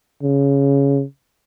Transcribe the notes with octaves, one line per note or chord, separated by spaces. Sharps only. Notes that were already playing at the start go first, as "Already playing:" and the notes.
C#3